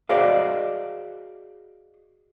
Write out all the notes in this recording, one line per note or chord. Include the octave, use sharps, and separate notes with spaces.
F#4 G#4 C5 D5 D#5 F5